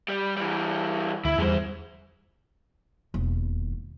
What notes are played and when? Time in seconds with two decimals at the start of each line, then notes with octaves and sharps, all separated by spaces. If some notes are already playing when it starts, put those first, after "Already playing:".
0.08 G3
0.37 E3 G3
1.25 D2 E4
1.38 E2 G3 G#3 C5
3.14 E1 D#2